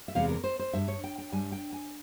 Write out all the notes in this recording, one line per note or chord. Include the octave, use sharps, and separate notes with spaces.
E5
E2 C3 E3 G#3 F5
A#4
C5
C5
G2 G3 E5
C#5
G5
G5
G2 G3 G#5
G5
G#5